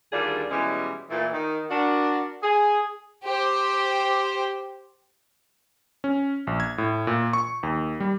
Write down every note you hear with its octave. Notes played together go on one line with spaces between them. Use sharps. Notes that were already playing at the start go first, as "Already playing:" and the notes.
D2 D#3 G3 D4 F4 G#4
B2 E3 G3 G#3 C#4
A#2 E3 A3
D#3
D4 F#4 A#4
G#4
G4 C5
C#4
A#1
G#6
A2
A#2
C#6
D#2
G3